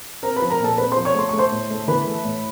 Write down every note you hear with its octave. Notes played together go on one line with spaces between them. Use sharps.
C4 A#4 A#5
B4 B5
F3
A#4 A#5
A#2 A4 A5
C4 B4 B5
F3 C5 C6
C#5 C#6
A3 C6
A3 C#6
C5 C6
A2
A3
E3 B4 B5
A3
A2